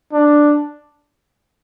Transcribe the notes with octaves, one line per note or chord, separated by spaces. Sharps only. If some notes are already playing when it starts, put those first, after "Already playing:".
D4